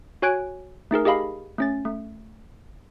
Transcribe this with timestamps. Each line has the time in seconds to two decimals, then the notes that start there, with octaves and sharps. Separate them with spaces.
0.22 F#4 C#5 G#5 F#6 G#6 D7
0.91 A3 D#4 G#4 A#4
1.05 G4 G#4 D#5 F5 B5
1.58 A3 C#4 A6
1.85 A3